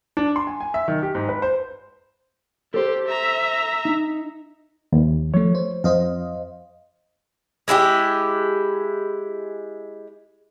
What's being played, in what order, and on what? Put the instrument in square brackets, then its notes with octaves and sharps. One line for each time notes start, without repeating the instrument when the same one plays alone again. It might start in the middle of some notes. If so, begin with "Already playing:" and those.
[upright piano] D4
C6
G#5
G#5
E5
D#3
G4
G#2
B4
C5
[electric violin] G4 [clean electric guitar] A4 C5
[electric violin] E5 A#5
[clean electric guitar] D#4
[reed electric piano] D#2
[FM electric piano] F3 A3 [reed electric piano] C#5
[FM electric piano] C5
[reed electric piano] F2 [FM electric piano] C5 D#5 F5
[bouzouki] G#3 E4 F#4 G4